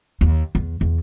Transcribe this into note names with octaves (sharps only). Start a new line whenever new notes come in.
D#2
E2
E2